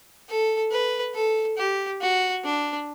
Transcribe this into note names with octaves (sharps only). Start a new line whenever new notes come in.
A4
B4
A4
G4
F#4
D4